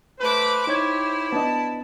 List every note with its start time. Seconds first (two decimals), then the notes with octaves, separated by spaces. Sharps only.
0.20 A3 B4 C5 D6
0.67 D#4 E4 G4 C#5 G#6
1.32 B3 D4 D#5 A5